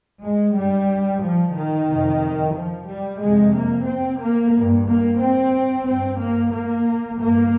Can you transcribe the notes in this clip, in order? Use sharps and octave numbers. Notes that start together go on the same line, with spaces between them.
G#3
G2 G3
F3
D#3
F2 C3
F3
G3
F2 C3 G#3
A#3
C4
A#3
G2
A#3
C4
G2 C4
A#3
A#3
G2 A#3